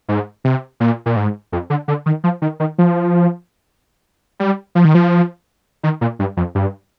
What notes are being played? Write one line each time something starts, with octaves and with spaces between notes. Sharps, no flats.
G#2
C3
A#2
A#2
G#2
F2
D3
D3
D#3
F3
D#3
D#3
F3
G3
F3
D#3
F3
D#3
A#2
G2
F2
G2